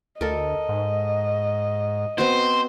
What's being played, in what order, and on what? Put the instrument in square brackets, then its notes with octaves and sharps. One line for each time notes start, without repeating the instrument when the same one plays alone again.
[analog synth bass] D2 [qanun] A4 A#4 [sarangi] D#5
[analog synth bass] G#2
[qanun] B3 C4 F#4 [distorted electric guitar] C5